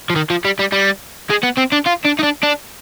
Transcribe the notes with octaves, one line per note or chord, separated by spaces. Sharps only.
F3
D#3
F3
G3
G3
G3
G#3
B3
C4
D4
F4
D4
D#4
D4
D4